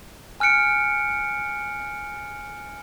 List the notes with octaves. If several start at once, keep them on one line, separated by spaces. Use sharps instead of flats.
G#5 F6 F#6 C#7 D7